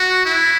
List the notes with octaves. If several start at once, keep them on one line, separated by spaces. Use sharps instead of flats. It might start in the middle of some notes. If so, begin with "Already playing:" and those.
Already playing: F#4
E4